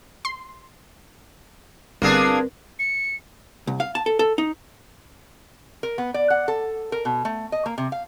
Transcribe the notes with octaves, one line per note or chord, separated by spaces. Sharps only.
C6
G1 A#3 C4 D4 G#4 A#4 B4
C#7
C2
F5
A5
A4
A4
D#4
A#4
B3
D5
F#5
A4
A#4
B2
A3
D#5
A#3
C3
F5